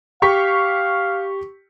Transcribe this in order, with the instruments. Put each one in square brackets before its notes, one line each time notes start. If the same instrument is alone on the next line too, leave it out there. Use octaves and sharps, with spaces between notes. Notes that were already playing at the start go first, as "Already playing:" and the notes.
[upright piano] G4 C#6 B6 [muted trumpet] F5